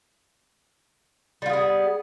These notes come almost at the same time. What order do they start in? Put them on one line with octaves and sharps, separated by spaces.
G3 F4 G#4 B3